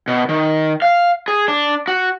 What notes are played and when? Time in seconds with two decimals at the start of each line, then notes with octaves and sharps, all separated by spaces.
0.08 B2
0.29 D#3
0.82 F5
1.28 G#4
1.48 D4
1.88 F#4